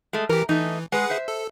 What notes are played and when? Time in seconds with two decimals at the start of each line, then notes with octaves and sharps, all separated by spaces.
0.13 G#3 A3
0.29 E3 G4 A#4
0.49 E3 A3 D#4
0.92 G#3 G#4 B4 F#5
1.10 C5 E5
1.28 A4